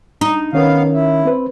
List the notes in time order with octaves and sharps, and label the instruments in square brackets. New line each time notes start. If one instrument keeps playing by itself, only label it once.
[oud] D#4
[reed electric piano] D#3 C#4 A#4 [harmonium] B3 F5
[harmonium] E4
[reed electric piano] C4 B4 C5